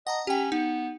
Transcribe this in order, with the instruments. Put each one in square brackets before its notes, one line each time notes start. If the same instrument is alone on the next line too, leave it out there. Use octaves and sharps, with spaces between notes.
[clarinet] D#5 [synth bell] F#5 A5 A#5
[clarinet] C#4 [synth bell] G4 G5
[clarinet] B3 [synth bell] D#4